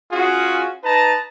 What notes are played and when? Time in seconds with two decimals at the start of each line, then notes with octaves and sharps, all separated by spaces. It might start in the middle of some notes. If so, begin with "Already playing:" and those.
0.12 C#4 F4 F#4 G#4
0.84 D#4 B4 A5 A#5